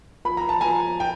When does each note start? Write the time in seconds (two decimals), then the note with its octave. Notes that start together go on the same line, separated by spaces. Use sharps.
0.25 F3 B5
0.37 A#5
0.49 A5
0.61 F3 G#5 A#5
1.00 G5